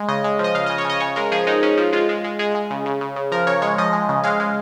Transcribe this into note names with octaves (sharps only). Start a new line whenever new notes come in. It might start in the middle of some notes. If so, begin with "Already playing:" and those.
Already playing: G#3
C#3 D#5
G#3
F3
D#5
C#3 F5
C#3 D#5
C#5
C#3 D#5
C#3 C#5
G#3 A#4
F3 G#4
G#3 D#4
G#3 C#4
F3
G#3 F4
G#3
G#3
G#3 G#4
G#3
C#3
C#3
C#3
C#3
F3 A#4
C#3 C#5
G#3 C#5
F3 D#5
G#3
C#3
G#3 F5
G#3